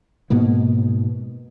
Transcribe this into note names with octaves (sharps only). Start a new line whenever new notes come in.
G#2 B2 A#3 B3